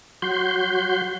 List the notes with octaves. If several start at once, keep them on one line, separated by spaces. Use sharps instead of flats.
F#3 F#4 C6 G6